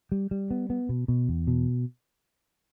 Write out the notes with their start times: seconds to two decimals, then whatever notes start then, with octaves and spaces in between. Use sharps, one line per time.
0.12 G3
0.31 G3
0.51 B3
0.70 B3
0.89 B2
1.08 B2
1.29 E2
1.47 B2